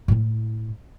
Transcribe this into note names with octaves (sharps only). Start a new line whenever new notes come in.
A2 E4